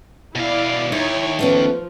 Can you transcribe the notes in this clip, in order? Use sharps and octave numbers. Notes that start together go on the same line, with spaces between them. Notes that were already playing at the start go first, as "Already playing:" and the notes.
B2 E4 D5 F5
D#2 D#4 E4 C#5
F3 A3 B3 C#4